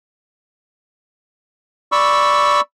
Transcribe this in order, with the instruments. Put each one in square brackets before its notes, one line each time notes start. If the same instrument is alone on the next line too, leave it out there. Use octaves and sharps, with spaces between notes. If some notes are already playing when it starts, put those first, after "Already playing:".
[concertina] D5 B5 C#6 E6